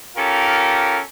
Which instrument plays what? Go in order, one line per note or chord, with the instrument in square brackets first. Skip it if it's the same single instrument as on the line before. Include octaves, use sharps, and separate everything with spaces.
[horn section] C#4 F4 G4 A4 A#4